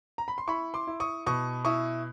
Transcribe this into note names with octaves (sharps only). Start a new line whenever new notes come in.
A#5
B5
C6
E4 B5 C#6
C6 D6
E4
C#6 D#6
B2 C#6 D#6
E4 C#6 D#6